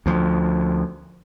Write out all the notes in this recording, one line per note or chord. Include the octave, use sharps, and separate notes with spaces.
D2 F3